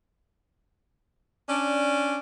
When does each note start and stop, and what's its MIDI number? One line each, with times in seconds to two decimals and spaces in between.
1.49 2.18 61
1.49 2.18 62